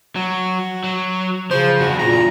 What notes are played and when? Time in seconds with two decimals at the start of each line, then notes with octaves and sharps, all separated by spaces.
0.16 F#3 F#4
0.84 F#3
1.51 C#3 F3 C5
1.80 E2 G2 F#4
1.99 A#2 A#5